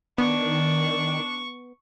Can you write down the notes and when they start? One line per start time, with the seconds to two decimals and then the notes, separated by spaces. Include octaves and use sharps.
0.18 D#3 B3 D4 C#6